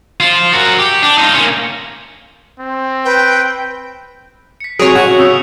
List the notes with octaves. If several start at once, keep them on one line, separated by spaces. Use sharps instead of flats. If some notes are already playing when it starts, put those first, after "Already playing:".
F3 F4
F#4 A#4
G4
D4
D#4 F4
A#3 C#4
C4
B4 G5
B6 C#7
C3 F#3 G#4 C#5 D7 D#7 F7
A1 F#4
C#3 C#6 D#6 E6